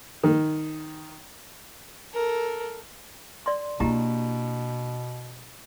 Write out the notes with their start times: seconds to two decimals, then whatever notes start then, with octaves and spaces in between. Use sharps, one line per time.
0.23 D#3
2.14 A4 A#4
3.46 D5 C6
3.80 B2 A#3 D4 E4 G4 A#5